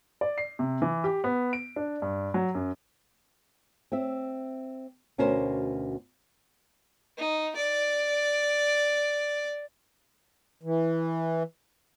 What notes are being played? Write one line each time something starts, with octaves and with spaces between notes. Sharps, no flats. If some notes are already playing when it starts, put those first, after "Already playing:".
D5
C7
C3
E3
G4
B3
D7
D4
G2
F#3
F#2
C4 E5
D2 B2 C#4 A#4 C5
D#4
D5
E3